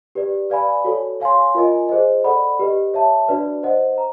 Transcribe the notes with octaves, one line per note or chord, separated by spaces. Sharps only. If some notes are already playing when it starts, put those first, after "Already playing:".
G4 B4 D5
B4 D5 F5 G#5 B5
F#4 A4 C#5
C#5 F5 G#5 C6
F4 A#4 D#5 G#5
G#4 C5 D#5
A4 D5 F#5 B5
G4 B4 D#5
C#5 E5 A5
D4 F#4 B4 D5
C5 D#5 F#5
A#5